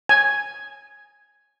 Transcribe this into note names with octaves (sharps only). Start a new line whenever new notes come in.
G#5